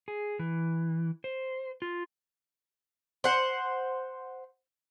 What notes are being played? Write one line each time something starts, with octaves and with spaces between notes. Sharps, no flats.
G#4
E3
C5
F4
C5 F#5